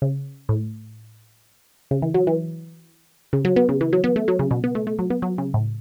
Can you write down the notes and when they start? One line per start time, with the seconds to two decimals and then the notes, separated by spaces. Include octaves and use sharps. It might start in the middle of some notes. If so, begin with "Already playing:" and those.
0.02 C#3
0.49 A2
1.91 C#3
2.02 E3
2.14 F#3
2.27 E3
3.33 C#3
3.45 F#3
3.56 B3
3.69 C#3
3.81 E3
3.93 F#3
4.04 B3
4.16 A3
4.28 F#3
4.39 C#3
4.51 B2
4.64 B3
4.75 A3
4.87 A3
4.99 F#3
5.10 B3
5.22 F#3
5.38 C#3
5.54 A2